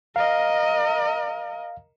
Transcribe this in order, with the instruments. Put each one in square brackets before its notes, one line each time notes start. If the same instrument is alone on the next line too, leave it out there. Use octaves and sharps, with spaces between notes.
[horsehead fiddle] A#4 D#5 [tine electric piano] F5